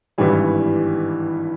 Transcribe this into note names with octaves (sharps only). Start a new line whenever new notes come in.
G#1 G2 E3 G3